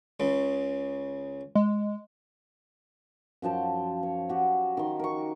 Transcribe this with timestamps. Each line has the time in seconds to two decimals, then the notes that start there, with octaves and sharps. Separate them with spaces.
0.20 C#2 C#3
1.55 G#3
3.42 F#2 F3 G5 A5
4.03 C#5
4.29 F#4 G4
4.77 D#3 C6
4.99 A#4 C#6